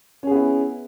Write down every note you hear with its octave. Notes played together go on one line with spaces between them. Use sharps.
B3 C#4 E4 G#4